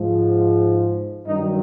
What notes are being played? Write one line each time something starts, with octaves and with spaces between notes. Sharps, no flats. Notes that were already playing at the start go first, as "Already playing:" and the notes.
Already playing: G#2 F3
G2 D#3 F#3 D#4